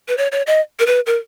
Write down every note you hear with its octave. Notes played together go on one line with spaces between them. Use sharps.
B4
C#5
C#5
D#5
A#4
B4
A#4